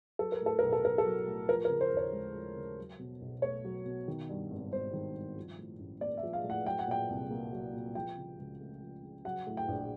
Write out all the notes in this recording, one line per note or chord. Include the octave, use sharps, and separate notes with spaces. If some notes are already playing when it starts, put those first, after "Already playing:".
F#3 A4
A#4
A2 A4
B1 A#4
A4
B1 A#4
A4
F#3
A2
F3 A#4
A#4
C#3
C5
D#2
C#5
G#3
F3
C#3
F#3
B2
B1
A3 C#5
F#3
B2
D#3
G2
G#1
G#1 C5
D#3
G2
F3
A2
A1
A#3 D5
E5
F3
F5
A2
F#5
F#3 G5
F#5
A#2 G5
C2
A#3
F#3
A#2
F3 G5
C#3
C#2
A3
F3
C#3
F#3 F#5
A2
G5
A#1